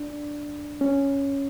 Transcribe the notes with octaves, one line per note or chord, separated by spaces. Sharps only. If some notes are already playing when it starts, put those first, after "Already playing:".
Already playing: D4
C#4